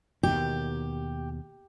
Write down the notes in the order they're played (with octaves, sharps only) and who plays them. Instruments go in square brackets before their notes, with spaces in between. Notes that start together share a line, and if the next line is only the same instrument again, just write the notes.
[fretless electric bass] D#2 B2 D#3 [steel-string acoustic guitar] G4